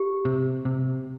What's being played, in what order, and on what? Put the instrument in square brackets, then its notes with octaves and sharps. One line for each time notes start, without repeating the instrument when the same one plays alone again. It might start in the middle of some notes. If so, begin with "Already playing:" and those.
Already playing: [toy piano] G4
[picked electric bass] C3
C3